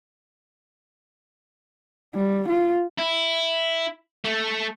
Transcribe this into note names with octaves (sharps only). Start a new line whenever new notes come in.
G3
F4
E4
A3